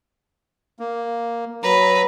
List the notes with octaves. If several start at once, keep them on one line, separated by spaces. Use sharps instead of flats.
A#3
F#3 B4 A#5